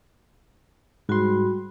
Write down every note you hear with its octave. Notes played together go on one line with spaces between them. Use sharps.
G#2 G3 F#4 B5 C6